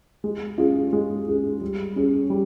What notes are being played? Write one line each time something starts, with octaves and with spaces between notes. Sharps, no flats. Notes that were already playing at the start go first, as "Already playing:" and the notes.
G#3
C#4 F4 G#4
G#3
C#4 F4 G#4
G3
C#4 G#4
G3